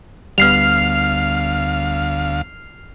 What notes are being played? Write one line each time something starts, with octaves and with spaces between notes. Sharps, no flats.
D2 G3 B3 F5 F6 C7 F7